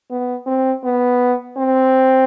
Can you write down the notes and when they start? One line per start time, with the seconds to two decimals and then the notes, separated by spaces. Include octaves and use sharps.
0.10 B3
0.46 C4
0.84 B3
1.57 C4